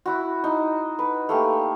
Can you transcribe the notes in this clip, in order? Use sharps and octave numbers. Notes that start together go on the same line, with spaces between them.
E4 F#4
D#4
B4
A3 A#3 G4